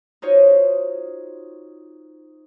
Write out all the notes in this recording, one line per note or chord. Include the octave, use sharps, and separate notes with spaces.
D#4 F4 F#4 C5 C#5 D#5